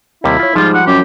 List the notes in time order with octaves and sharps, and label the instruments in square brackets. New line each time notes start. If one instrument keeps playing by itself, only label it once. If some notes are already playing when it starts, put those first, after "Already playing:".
[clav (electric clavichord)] D#2 C3 G3 [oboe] E4
[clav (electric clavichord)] F4 C#5
[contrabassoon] G#2 [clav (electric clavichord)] F3 G3 [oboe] F4
[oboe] F#5
[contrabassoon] F#2 [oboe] G4